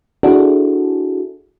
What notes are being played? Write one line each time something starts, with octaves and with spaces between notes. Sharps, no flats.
D4 E4 F#4 G#4 A4